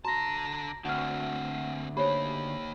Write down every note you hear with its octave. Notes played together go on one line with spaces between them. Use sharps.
D3 F#4 A5 A#5 A#6
D2 C4 D4 F#5 F6
A#3 D#4 G4 C5 C#5 B5